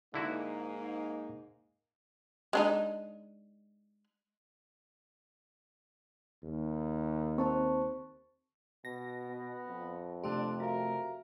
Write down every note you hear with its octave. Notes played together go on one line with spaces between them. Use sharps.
G#2 D3 A#3 D#4 E4 F#4
G#3 D4 D#4
D#2
C4 C5 A5 C#6
B2 A#6
B3
F2
C3 A3 D4 G4 C6
F#4 A#4 E5 F5